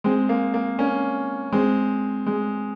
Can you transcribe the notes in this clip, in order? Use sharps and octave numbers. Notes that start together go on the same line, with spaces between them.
G#3 C4
A#3
A#3
A#3 C#4
G#3 C4
G#3